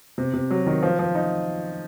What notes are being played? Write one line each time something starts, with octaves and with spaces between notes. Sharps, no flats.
C3
C3
F#3
D#3
F3
F3
D#4